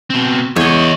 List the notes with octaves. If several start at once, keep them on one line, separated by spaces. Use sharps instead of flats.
B2 C4
E2 C#5 D#5